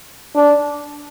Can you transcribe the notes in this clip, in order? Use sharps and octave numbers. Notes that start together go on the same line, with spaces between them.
D4